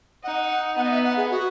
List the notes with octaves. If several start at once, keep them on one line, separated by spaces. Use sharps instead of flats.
D#4 F#5
B3 F#5
D#5
E5
F#5
G#4
F#4